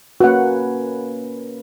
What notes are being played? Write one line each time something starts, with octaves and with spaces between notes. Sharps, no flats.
A#3 C#4 F#4 B4 F#5